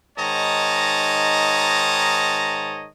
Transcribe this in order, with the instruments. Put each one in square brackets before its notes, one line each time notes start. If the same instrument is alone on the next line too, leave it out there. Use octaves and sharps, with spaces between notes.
[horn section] G#2 D#3 C#5 D#5 A5 A#5